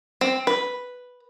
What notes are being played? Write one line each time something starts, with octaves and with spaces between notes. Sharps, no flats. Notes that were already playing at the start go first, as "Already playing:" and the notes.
C4
B4